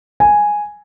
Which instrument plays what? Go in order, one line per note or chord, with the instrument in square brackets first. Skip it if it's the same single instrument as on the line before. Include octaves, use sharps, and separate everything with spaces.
[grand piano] G#5